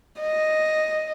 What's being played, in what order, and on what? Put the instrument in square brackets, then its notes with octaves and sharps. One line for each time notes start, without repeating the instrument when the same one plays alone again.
[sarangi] D#5